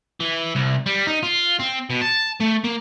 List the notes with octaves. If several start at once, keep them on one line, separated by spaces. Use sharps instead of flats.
E3
C2
G3
D#4
F4
C4
B2
A5
A3
A#3